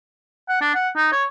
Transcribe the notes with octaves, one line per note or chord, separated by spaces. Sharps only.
F#5
D4
F#5
D#4
C#5